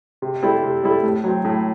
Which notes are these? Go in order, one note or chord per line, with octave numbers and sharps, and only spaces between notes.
C3
G3 C4 E4 A4
C3
G3 C4 E4 A4
A2
F#3 C4
A2